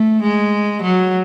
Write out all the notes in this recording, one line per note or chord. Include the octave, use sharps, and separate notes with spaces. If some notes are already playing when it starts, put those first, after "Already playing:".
Already playing: A3
G#3
F#3